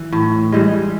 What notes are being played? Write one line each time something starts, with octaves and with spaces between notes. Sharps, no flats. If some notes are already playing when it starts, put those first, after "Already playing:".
Already playing: E3
A2
E3 G3 G#3